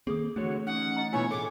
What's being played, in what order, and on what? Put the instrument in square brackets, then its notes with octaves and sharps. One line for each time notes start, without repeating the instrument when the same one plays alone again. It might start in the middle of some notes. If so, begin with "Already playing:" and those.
[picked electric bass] D#3 A#3 C4 [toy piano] G#4 A4 D#6
[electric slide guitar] D3 F#4 C#5 [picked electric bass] E3 A3
[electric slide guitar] C#4 D#4 [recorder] F#5
[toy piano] D#5 A#5
[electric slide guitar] B2 B3 E4 [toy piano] D4 F4 G#5 [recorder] C#5
[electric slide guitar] A2 G#4 A4 [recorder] D6